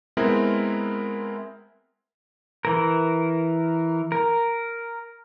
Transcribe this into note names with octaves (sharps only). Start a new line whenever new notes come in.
G#3 B3 C4 E4 A#4
E3 A#4
A#4